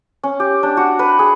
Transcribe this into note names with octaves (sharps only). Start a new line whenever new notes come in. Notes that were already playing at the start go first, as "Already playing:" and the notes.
C#4
G4
D4
F#4
B4
G#4